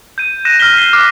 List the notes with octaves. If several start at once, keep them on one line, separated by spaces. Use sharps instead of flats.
G6 D#7
F#6 A#6 D#7 E7
F6 A#6 B6 G7
G6 C7 G7
D6 F6 F#6 C7 G7